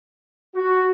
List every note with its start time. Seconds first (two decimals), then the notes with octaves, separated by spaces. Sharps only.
0.55 F#4